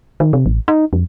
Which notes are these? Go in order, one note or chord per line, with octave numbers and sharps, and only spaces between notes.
D#3
C3
A1
D#4
F2